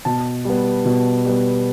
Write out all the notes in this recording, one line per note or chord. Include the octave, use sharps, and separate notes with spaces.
B2 A5
G3 B3
B2
G3 B3